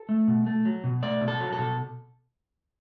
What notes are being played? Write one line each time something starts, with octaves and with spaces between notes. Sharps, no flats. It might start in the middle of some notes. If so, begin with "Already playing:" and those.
Already playing: A4
A3
B2
A3
F#3
B2
A3 D5
B2
A4
F#3
A4
B2